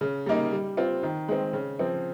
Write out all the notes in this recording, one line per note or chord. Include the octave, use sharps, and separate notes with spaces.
C#3
G3 A#3 D#4
G3
C4 F4
D#3
G#3 C4
C#3
F3 C4